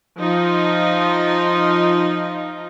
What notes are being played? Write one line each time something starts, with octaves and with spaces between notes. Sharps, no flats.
F3 D#4 F4